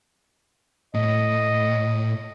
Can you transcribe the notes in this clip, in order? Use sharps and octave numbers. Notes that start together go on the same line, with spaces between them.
A2 D#5